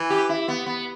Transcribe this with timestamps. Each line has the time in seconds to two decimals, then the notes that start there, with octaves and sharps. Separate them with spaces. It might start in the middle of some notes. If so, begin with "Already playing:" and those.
Already playing: E3
0.10 G4
0.29 E4
0.48 B3
0.66 B3